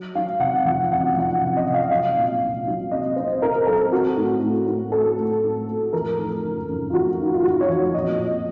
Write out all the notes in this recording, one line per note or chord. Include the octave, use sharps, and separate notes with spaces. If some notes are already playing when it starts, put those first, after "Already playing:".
Already playing: F#3
F#3 F5
C3 F#5
F2 F#5
F#1 F#5
F2 F#5
C3
D#5
C3
F5
F#3 F5
A#2
C2
F#3
C4 D#5
C4 C5
C4 A#4
F#3 A4
C4 F#4
A2
A2
A2
A3 A4
A3
A2
A3
F2 A#4
D#3
F#1
F#1
F4
F2 F#4
D#3
F4
F#1 F#4
C#5
F2
A#2 D#5
A#2